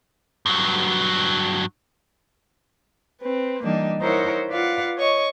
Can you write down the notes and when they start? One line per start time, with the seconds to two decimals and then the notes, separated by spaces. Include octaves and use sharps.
0.46 G2 F#3
3.21 C4 B4
3.62 E3 G3 A#3 D4 D#4
4.00 D#4 E4 A#4 C5 C#5 F#5
4.49 F4 B4 D5 F5 F#5
4.97 C#5 D#5 C#6